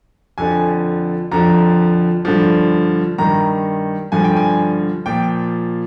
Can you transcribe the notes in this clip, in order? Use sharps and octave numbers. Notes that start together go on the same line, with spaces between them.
F2 D3 F3 G#5
F2 D3 F3 A#5
G2 D3 F3
G2 D#3 A#5
G2 D3 F3 G#5
G5
G#5
A#2 F3 G5